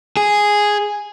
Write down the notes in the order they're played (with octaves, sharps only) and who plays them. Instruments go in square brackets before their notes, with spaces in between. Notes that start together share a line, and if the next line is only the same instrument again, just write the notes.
[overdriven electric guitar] G#4